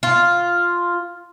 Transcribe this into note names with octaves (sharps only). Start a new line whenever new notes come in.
F4